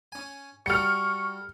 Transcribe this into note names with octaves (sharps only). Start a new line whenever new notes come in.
C#4 G#5
G3 F#4 A4 C#6 F6 C#7